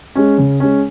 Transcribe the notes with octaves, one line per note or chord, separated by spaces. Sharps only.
G#3 C#4
C#3
G#3 C#4